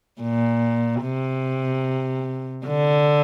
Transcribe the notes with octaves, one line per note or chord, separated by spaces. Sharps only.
A#2
C3
D3